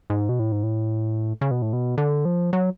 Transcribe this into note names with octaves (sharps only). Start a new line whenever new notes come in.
G#2
B2
A2
G#2
A2
C#3
B2
A2
B2
D3
F3
F#3